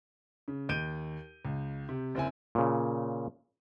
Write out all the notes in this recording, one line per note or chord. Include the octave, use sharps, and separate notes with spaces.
C#3
D#2 G6 D7 D#7
C#2
C3
F#1 C4 E4 G#5
A#2 C#3